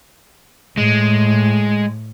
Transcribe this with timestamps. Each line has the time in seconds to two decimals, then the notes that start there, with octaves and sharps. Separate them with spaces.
0.78 A2 G#3